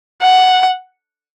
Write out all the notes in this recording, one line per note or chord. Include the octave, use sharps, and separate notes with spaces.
F#5